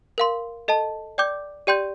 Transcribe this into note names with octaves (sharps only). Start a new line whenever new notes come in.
A#4 F5 C6
A4 D#5 A5
D5 G5 D6 G6
G4 D5 G5 C6 G6